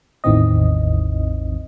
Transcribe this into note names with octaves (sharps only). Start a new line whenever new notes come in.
A1 E2 D#3 E3 C4 D#5